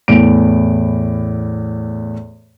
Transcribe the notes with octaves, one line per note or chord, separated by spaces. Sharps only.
E2 A2 D7